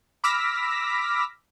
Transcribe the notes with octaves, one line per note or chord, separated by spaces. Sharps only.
B5 D6 E6 F6 A#6 B6